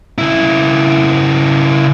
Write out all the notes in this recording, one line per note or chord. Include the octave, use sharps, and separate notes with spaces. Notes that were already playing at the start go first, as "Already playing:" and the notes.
C#3 E4